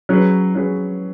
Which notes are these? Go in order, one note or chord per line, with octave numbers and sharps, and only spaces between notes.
F#3 C#4 G#4 B4
F#3 C#4 G#4 B4